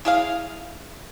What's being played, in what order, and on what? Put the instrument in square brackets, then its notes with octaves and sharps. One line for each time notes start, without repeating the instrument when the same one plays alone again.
[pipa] E4 G#4 F5